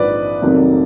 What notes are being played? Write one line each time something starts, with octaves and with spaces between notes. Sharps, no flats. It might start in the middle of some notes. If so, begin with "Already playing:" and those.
Already playing: A#1 G#2 F3 B4 D5
F1 F2 D#3 F#3 A#3